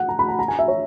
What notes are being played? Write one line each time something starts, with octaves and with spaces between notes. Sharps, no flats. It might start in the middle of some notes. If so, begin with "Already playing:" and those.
Already playing: F#5
A#5
B5
A#5
A#5
G#5
E5
C#5